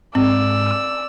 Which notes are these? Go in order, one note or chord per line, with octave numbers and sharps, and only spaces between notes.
G#2 C4 D5 E6